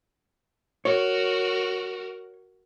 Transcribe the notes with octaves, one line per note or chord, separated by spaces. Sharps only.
F#4 A#4 C#5